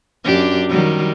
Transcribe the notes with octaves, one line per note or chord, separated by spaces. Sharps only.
F#2 D4 G4
D#3 F#3 G3